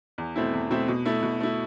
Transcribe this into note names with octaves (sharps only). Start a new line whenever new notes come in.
E2
B2 A3 C4 E4
E2
B2 A3 C4 E4
B2
A3 E4
B2
A3 E4